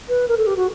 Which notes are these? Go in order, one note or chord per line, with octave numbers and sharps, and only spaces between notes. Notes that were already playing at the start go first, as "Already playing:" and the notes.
B4
A#4
A4
G4
F#4